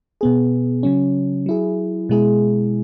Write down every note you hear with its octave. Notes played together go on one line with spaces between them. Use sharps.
B2 B3 G#4
C#3 F#3 C#4
F#3 E4 G#4
B2 G#3 E4 G#4